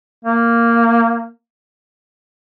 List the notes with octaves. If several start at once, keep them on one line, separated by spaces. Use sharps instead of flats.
A#3